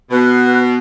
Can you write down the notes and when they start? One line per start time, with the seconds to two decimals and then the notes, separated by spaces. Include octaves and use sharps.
0.11 B2 B4